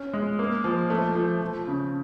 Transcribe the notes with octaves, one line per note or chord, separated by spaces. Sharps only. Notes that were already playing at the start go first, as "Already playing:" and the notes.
Already playing: C#4
G#3
A#3
F3
A3
F3
F3
C#3